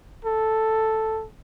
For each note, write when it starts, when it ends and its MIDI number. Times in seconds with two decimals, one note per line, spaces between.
0.25 1.25 69